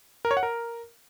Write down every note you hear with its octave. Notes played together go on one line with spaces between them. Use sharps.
A#4
C#5
F#5
A#4